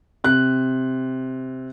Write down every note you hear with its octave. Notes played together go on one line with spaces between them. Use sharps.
C3 F#6